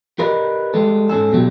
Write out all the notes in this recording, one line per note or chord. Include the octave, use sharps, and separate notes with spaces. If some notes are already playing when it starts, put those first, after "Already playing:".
G4 A#4 B4 D5 D#5
G3 G#3 A4
G#2 C#4 G#4 A4
B2 F#3 G3